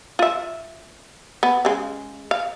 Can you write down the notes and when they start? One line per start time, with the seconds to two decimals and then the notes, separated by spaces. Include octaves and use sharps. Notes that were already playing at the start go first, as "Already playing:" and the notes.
0.19 F4 E5
1.43 B3
1.65 C#3 G#3
2.31 F5